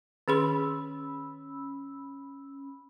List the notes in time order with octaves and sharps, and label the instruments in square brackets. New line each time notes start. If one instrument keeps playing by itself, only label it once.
[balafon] D#3 G#4 C6 [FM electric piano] C#4 B5 E6